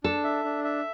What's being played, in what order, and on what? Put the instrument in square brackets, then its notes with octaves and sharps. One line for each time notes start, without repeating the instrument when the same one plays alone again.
[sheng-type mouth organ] D4 [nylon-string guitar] A4
[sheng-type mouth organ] E5
D4
E5